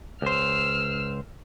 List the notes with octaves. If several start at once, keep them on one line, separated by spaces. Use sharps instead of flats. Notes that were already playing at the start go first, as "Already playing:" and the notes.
C#2 C5 E6 F6